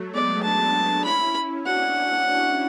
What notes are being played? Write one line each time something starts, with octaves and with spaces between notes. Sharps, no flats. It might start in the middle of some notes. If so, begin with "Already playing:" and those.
Already playing: F#3 A3
G#3 B3 D5
B3 D4 A5
C#4 E4 B5
D4 F#4 F#5